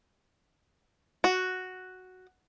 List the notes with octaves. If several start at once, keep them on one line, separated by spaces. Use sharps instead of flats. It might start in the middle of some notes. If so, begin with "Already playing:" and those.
F#4